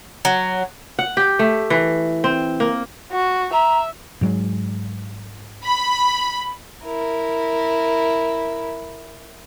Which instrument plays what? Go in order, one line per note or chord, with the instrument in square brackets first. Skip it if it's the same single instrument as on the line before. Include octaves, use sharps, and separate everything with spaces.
[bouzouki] F#3
[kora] F#5
G4
A3
E3
C4
A#3
[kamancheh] F#4
[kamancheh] E5 [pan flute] A#5
[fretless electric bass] G#2 F#3 G#3
[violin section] B5
[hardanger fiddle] E4 A#4